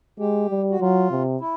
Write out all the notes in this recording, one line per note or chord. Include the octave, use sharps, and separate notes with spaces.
G#3 G4
G3
F#4
F#3 F4
C3
E4